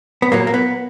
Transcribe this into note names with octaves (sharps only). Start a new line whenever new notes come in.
B3
A#2 F#3 A#3
A#3
B3